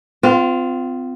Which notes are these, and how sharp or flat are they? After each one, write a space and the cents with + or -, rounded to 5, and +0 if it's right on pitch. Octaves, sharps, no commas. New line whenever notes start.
C4 -35 F4 +0